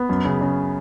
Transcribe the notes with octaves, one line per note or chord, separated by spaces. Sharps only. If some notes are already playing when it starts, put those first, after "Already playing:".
Already playing: B3
F#2
C#3
C#3